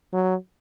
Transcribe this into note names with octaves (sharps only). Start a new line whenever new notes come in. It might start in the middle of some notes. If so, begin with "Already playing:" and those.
F#3